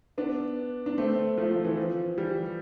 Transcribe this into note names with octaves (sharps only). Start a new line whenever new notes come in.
B3 D4
D4
A3 C4
F3 A3
F3
E3
F3
E3 G3